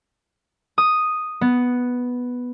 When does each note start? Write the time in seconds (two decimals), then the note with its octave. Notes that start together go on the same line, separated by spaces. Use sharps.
0.78 D#6
1.41 B3